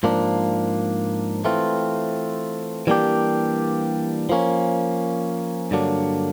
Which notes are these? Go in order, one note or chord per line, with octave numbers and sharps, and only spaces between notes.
G#2 F3 A#3 D4
E3 A3 C4 F4
E3 G3 A#3 D4 G4
F3 A#3 C#4
G2 D3 F#3 A#3 D4